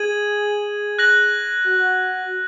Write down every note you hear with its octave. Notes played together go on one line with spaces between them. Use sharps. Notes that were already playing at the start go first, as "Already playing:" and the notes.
Already playing: G#4 G#6 D#7 F#7
F#6 A#6 F#7
F#4